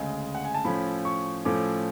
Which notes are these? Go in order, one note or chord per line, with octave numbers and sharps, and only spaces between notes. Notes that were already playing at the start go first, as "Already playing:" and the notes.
Already playing: D2 C#3 G#3
F#5
G#5
A5
A2 F3 A3 C#4 B5
C#6
A2 F3 A3 C#4 D6